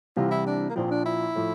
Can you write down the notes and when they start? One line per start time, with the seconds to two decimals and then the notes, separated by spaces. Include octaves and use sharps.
0.17 C2 C3 E3 G3 F4
0.31 E4
0.46 D4
0.70 A#3
0.76 A#1 A#2 F3 C4
0.91 D4
1.06 E4
1.35 A2 F3